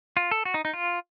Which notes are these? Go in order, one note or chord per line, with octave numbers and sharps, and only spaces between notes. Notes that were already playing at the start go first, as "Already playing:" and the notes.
F4
A4
F#4
D#4
D#4
F4